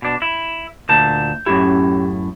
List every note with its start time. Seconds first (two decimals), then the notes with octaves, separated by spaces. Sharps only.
0.02 B2 D4
0.22 E4
0.89 D2 A#2 A5 G6
1.46 F#2 A2 C#4 E4 G4